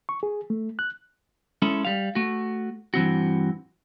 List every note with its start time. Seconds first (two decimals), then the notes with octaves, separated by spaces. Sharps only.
0.09 C#6
0.23 G#4
0.50 A3
0.79 F#6
1.62 G#3 C#4 E4 A4
1.85 G3 F5
2.15 A3 F#4
2.94 G2 E3 C4 F#4